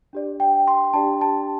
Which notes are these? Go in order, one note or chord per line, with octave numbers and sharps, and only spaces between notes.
D4 G4 D5
G5
C6
D4 G4 D5 A5
A5